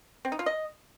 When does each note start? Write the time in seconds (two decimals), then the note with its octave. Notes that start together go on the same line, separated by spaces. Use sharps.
0.25 C4
0.32 D#4
0.39 F4
0.46 D#5